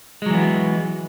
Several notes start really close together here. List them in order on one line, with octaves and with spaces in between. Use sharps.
G#3 F#3 E3 B3